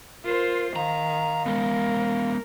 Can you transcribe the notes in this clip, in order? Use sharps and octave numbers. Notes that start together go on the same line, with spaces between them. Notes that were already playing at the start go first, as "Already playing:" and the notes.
F4 A#4 C5
D#3 F5 A#5
G#3 B3 A#4